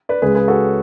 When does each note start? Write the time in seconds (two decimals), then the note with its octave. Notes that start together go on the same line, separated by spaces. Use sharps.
0.09 B4 D5
0.22 C#2 C#3 G#3 G#4 B4
0.35 G#4 B4
0.48 F#4 A4